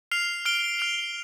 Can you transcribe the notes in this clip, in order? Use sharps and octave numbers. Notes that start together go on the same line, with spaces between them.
F6 C7 F7
F6 D7 G7
F6 D7 F7